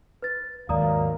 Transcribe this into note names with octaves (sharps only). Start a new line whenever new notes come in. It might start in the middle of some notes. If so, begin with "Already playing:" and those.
B4 A6
D#2 G#2 F#3 A#4 D5 F5 A#5 D#6